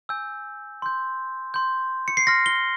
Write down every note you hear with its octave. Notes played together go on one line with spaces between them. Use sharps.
G#5 E6 G6
C6 G6
C6 G6
C#7
C7
C6 F6 A#6
G7